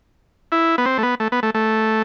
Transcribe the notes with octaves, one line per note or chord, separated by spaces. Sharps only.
E4
B3
C4
A3
B3
A3
B3
A3
A3